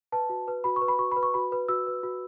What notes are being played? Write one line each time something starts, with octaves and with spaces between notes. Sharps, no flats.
B4 A5
F#4
B4
F#4 B5
C#6
B4
B5
F#4 C#6
B4 B5
C#6
F#4 B5
B4
F#4 E6
B4
F#4